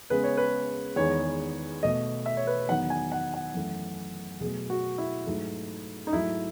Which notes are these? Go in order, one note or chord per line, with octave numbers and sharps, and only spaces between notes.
C#3 G#3 B3 B4
C#5
B4
E2 D#3 G#3 B3 C#5
B2 A3 D#5
E5
C#5
B4
E2 D#3 F#3 B3 F#5
G#5
F#5
F#5
F#2 E3 A3
B2 F#3 A3 G#4
F#4
E4
G#2 F#3 A3
D#4
G#2 F#3 A3 E4